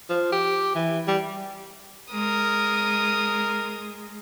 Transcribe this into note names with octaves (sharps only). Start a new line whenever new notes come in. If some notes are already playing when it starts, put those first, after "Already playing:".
F3
G4
E3
G3
G#3 A#4 D#6